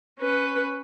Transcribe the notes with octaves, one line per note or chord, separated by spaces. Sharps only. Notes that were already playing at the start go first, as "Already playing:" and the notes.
C#4 B4